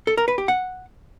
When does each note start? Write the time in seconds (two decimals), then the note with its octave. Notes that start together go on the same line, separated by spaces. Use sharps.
0.07 A4
0.17 A#4
0.28 B4
0.38 G4
0.48 F#5